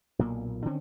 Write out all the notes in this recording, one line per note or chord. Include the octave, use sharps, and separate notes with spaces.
B1 A#2 A#3
D3 D#3 C4 C#4